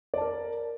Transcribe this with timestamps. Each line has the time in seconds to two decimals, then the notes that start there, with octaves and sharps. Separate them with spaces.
0.14 D5
0.17 A5
0.21 A#4